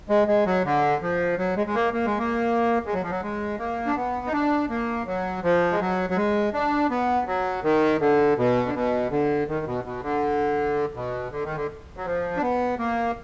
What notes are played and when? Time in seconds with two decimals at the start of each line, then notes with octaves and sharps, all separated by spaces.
0.09 G#3
0.28 G#3
0.46 F#3
0.65 D3
1.02 F3
1.38 F#3
1.57 G#3
1.67 G#3
1.74 A#3
1.94 A#3
2.06 G#3
2.18 A#3
2.86 G#3
2.94 F#3
3.02 F3
3.10 F#3
3.23 G#3
3.59 A#3
3.86 D4
3.96 B3
4.26 D#4
4.32 D4
4.70 A#3
5.07 F#3
5.43 F3
5.72 G#3
5.80 F#3
6.10 F#3
6.16 G#3
6.54 D4
6.90 B3
7.27 F#3
7.64 D#3
8.01 D3
8.38 B2
8.66 D3
8.75 B2
9.11 D3
9.48 D#3
9.66 B2
9.84 B2
10.03 D3
10.95 B2
11.32 D3
11.44 D#3
11.55 D3
11.97 F#3
12.05 F3
12.37 D4
12.42 B3
12.78 A#3